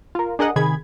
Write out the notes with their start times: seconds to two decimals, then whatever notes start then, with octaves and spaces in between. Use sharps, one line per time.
0.15 F4 A#4
0.39 D4 G#4 A#4 D#5 F#5
0.56 C3 D#3 G#4 B5 G#6